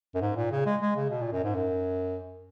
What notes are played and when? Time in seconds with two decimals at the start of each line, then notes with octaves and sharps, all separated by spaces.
0.15 F#2
0.22 G#2
0.36 A#2
0.52 C#3
0.66 G#3
0.81 G#3
0.96 C#3
1.10 B2
1.21 A#2
1.32 F#2
1.44 G#2
1.55 F#2